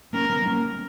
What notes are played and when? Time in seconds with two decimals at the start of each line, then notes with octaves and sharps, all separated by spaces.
0.13 A#3 C#4 A#4
0.30 G3 B3
0.46 A#3 C#4